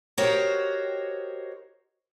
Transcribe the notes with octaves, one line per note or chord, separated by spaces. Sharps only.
F#4 G4 A#4 C5 C#5 D#5